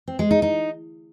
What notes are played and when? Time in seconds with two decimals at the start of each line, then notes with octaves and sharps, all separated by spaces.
0.08 C4
0.19 G#3
0.31 D#4
0.42 D#4